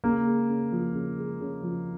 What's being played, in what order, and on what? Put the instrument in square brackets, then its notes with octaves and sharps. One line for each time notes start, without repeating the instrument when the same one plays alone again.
[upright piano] C#3 [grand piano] A#3
[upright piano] G#3
C#3
F3
C#3
G#3
C#3
F3